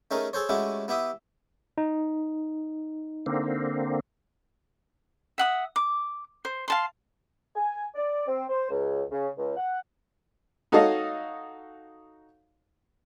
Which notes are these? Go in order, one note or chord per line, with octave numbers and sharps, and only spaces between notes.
A3 C#4 D#4 G#4 A#4
G#4 A4 C5 C#5
G#3 A3 C#4 E4 F#4 G4
B3 E4 G4 E5 D#6
D#4
D3 A#3 C4
E5 F#5 D#6
D6
C5
F5 A5 C6
G#5
D5
C4
C5
C#2
C#3
C#2
F#5
D#4 F#4 A4 C#5 D#5 F5